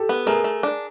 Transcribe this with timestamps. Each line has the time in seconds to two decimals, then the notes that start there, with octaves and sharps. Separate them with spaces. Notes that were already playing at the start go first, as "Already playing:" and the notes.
Already playing: G4 A4
0.09 B3
0.27 A3 G#4 A#4
0.44 A3
0.63 D4